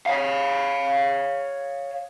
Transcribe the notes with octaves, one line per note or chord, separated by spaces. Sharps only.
C#5 F5